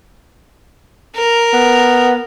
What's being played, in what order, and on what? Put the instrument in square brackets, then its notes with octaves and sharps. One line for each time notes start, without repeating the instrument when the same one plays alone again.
[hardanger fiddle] A#4
[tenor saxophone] B3